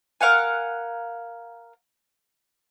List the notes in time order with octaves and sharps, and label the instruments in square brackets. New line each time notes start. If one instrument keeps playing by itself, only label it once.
[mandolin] A#4 F5 F#5 G#5